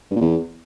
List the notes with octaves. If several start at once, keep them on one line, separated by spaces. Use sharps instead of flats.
G2
A#2
E2